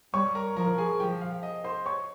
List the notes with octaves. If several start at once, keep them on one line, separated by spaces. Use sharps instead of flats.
G3 C#5 C#6
A#4 A#5
F3 A#4 A#5
G#4 G#5
F3 G4 G5
F5
D#5
C5 C6
C#5 C#6